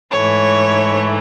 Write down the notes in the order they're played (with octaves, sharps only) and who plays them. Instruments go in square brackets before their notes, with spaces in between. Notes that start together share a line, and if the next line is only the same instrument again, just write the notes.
[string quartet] G#2 E3 A3 C#5